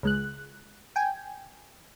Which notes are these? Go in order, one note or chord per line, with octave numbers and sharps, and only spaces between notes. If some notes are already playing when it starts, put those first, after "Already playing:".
C#2 G#3 F#6
G5 G#5